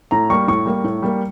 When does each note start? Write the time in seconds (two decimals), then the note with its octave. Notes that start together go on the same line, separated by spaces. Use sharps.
0.11 A2 A#5
0.30 G3 A#3 C#6
0.48 A2 C#6
0.65 G3 A#3
0.84 A2
1.02 G3 A#3